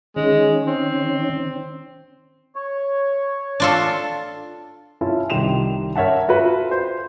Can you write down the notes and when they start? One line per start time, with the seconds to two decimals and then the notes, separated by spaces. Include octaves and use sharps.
0.16 D#3 G#3 C#4
0.66 C4
2.56 C#5
3.60 D4 F4 A4
5.01 C#4 E4 F4 A5
5.30 C2 D#3 G3 C6 E7 F7
5.96 A#4 C#5 E5 F#5 A5
6.28 F4 F#4 A4 B4 E5
6.71 C5